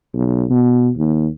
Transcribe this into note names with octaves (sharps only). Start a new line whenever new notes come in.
B1
B2
D#2